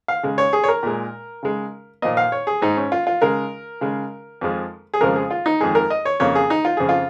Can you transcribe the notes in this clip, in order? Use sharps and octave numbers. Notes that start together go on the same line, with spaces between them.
F5
C#3 G#3
C#5
G#4
C#5
A#4
A#2 G#3
C#3 G#3
A#2 F3 A#3 D#5
F5
C#5
G#4
G#2 G#3 D#4
C#4
F4
F4
C#3 G#3 A#4
C#3 G#3
F2 F3 G#3
G#4
F2 C#3 F3 G#3 A#4
G#4
F4
D#4
F2 D#3 G#3 G#4
A#4
D#5
C#5
F2 C#3 A#3 C#5
G#4
D#4
F4
F2 C#3 F3 G#4
F4